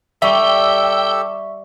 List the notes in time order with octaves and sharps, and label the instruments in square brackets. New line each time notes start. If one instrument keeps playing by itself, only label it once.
[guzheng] G3 [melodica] G4 A4 E6 [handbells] E5 C#6 [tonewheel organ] G5